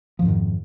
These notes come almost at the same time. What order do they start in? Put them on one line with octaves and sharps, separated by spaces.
F3 F2 G#2 D#3